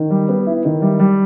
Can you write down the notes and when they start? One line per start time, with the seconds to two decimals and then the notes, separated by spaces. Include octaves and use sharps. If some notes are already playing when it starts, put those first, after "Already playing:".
Already playing: D#3
0.10 G3
0.29 B3
0.47 E4
0.65 D#3
0.82 G3
1.00 G3